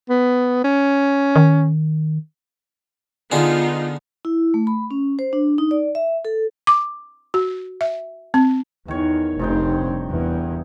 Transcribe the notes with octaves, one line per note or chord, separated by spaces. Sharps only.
B3
C#4
D#3
D3 B3 D#4 F4 G#4
E4
A3
B5
C#4
C5
D4
D#4
D5
E5
A4
D6
F#4
E5
C4
E2 D#3 C#5
F1 G2 C4 D#4 G5
E2